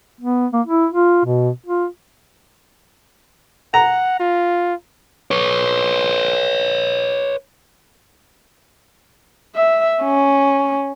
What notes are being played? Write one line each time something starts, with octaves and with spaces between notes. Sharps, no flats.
B3
A#3
E4
F4
B2
F4
F#5 A#5
F4
B4 C#5
E5
C#4